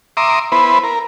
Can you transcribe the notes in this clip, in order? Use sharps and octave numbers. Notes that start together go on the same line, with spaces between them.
E5 A#5 C6 D6 D#6
B3 E4 B4 C5
A#4